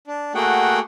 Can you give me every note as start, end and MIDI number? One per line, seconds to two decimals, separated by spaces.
0.07 0.33 62
0.35 0.79 57
0.35 0.79 58
0.35 0.79 66
0.35 0.79 68
0.35 0.79 78
0.35 0.79 79